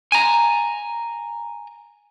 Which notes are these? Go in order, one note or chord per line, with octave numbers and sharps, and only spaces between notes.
G#5 A#5